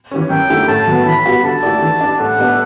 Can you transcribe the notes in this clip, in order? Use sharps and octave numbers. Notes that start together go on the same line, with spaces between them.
E3 G3 C#4
F#2 G5
D3 A3 E4 G4
A2 A5
F#3 B3
E3 B5
G3 B3 F#4
D3 A5
A3 E4 G4 D5
E3
G3 D4
A2 F#5
G3 B3 D4 A4